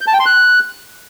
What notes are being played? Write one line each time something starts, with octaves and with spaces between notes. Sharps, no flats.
G6
A5
G5
C6
F#6